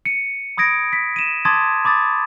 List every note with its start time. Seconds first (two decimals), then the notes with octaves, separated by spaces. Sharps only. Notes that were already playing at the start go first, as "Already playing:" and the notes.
0.05 C#7 D#7
0.57 B5 D#6 G#6 A#6 D7
0.93 B6
1.16 D#7 E7
1.45 A5 C6 D6 D#6 G#6 A6
1.85 B5 D6 D#6 A6